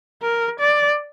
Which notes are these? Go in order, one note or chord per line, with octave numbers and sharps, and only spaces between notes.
A#4
D5